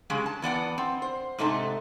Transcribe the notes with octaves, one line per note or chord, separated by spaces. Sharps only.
C#3 G3 G#3
A5
E2 B3 D5 F#5
C4
C5
G#2 C3 A3 D#4 A5